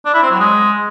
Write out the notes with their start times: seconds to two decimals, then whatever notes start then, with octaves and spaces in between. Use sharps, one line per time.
0.05 D4
0.14 E4
0.22 C4
0.31 F#3
0.39 G#3